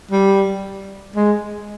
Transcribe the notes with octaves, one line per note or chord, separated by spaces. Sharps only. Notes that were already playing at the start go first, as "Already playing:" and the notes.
G3
G#3